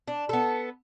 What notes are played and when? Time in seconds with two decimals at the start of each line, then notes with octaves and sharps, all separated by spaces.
0.08 D4
0.29 B3 A4